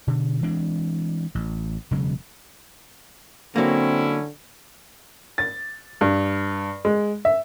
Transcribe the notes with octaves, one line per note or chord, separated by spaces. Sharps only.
B2 D3
E3 G#3 C4 D4
A1
E1 C#3 F#3 G#3
D3 F#3 A#3 C4 C#4 E4
A6
G2
G#3
E5